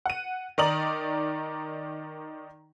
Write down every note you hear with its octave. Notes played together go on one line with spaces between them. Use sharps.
F#5 D#7
D#3 D#4 D5 A#5 D#6 F#7